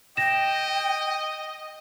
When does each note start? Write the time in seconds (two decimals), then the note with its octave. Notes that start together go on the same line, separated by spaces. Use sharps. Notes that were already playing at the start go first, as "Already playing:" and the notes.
0.17 D#5 G5 A#6 E7